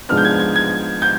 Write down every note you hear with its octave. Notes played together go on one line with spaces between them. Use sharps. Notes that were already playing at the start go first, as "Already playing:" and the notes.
G#2 F3 G#3 B3 D4 F6
G6
G#6
G#6
G#6
G6